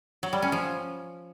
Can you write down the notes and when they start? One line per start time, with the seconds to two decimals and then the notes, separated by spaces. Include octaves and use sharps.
0.23 F#3
0.33 G3
0.42 C#4
0.52 F3